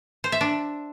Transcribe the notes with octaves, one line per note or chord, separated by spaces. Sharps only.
C5
E5
D4